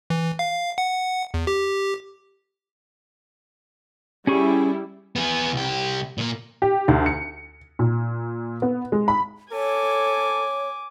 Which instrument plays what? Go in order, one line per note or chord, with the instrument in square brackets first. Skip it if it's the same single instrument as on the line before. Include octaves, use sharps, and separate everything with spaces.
[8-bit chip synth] E3
F5
F#5
E2
G4
[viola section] G3 E4 [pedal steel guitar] C#4 G#4 C#6
[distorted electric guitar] B3 G#4
C2 G4
A#2 A#3
[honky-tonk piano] G4
D2
C#7
A#2
B3
G#3
B5
[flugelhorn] A4 [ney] C#5 [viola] G#5 D6